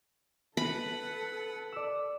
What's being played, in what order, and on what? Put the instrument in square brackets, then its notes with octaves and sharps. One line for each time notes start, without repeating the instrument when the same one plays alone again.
[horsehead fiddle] A4 [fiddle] B4 F#5 [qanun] B5
[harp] D5 E6